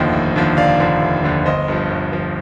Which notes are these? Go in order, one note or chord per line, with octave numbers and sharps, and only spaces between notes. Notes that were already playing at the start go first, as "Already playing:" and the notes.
Already playing: F1 D#2 D3 F3 D#5 G5
F1
D#2 D3 F3
F1 D5 F5
D#2 D3 F3
F1
D#2 D3 F3
G1 C5 D#5
G2 F3
G1
G2 F3